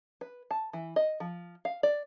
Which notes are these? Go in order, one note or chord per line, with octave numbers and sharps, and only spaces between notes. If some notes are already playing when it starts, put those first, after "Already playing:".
B4
A5
E3
D#5
F3
F5
D5